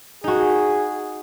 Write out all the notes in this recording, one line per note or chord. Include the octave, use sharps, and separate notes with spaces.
D#4 F#4 G#4